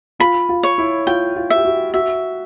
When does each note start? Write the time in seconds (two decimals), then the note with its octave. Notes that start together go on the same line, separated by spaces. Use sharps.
0.20 F4 B5
0.49 F4
0.63 C#5
0.78 E4
1.07 F4 G5
1.36 F4
1.50 E5
1.55 G4
1.65 F#4
1.94 F#4 E5